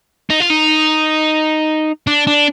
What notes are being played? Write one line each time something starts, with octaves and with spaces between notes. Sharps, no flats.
D#4
F4
D#4
D4
D4